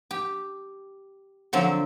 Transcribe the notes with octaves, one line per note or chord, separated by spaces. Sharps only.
G4
D3 F3 F#3 C4